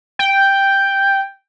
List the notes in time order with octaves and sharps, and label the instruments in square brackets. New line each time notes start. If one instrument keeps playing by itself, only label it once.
[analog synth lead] G5